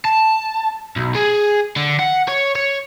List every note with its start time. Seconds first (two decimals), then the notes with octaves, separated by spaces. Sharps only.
0.05 A5
0.96 B1
1.15 G#4
1.77 D3
1.99 F#5
2.28 C#5
2.56 C#5